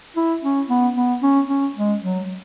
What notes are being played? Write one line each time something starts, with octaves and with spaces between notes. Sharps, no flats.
E4
C#4
B3
B3
C#4
C#4
G#3
F#3